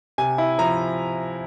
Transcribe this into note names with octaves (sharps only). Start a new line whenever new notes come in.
C3 G#5
E4
F3 A#5